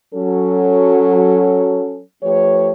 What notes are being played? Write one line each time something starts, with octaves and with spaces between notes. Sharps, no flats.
F#3 C#4 A4
F3 A3 G4 B4 C#5